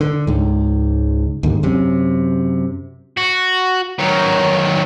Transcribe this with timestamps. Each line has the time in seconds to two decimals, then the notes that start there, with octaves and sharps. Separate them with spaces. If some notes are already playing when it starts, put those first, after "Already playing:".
0.01 D3
0.27 C#2 G#2
1.43 D#2 G#2 D3
1.63 F#2 C3
3.17 F#4
3.99 D#3 F#3